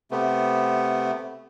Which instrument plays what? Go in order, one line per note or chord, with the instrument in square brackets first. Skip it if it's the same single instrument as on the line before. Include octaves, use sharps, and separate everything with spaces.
[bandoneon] C3 A3 B3